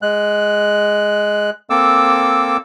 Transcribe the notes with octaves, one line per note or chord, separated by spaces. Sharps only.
G#3 F#6
A#3 C4 A4 D6 E6